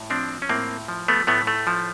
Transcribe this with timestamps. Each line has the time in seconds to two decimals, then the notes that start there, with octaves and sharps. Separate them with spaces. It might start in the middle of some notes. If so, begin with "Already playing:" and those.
Already playing: A2
0.10 F3 C4 D4
0.42 C#4
0.49 A2 A#3 C4
0.88 F3
1.08 A3 B3
1.27 A2 A3 B3
1.47 A3
1.67 F3